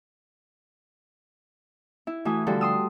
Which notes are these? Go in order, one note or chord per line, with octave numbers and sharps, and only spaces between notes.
E4
E3 A3 F#4 G#5 D#6
D3 F3 G3 F#4 A4
C6 D#6 E6